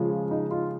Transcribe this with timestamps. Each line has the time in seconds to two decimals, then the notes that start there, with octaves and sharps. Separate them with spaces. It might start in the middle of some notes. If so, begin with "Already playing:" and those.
Already playing: C#3 F3 G#3
0.10 F4
0.31 D#4
0.51 F4